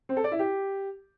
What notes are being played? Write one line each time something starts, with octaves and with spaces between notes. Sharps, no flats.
C4
A4
D5
E4
G4